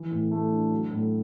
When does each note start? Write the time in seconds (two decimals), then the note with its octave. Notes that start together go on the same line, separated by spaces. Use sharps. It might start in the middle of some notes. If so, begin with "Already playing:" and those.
Already playing: E3
0.11 A2
0.31 A3
0.51 D4
0.71 F#3
0.91 A2